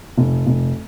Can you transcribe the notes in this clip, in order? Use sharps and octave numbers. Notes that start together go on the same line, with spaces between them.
F1
F1